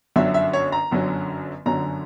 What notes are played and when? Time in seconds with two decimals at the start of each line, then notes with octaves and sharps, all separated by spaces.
0.16 G1 F#2 D3 F#3 C#4 E5
0.34 E5
0.53 C#5
0.72 A#5
0.91 G1 F#2 D3 F#3 C#4
1.66 G1 F#2 D3 F#3 C#4 A#5